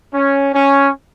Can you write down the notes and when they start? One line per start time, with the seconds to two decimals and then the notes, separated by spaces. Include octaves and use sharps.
0.14 C#4
0.54 C#4